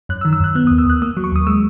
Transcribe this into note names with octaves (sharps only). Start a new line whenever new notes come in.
F#2 F#6
E6
D#3
E6
F#2 F#6
B3 F#6
D#6
D#2
E6
D#2 F#6
A#3 D#6
F#3
C#6
D#2 D#6
G#3 E6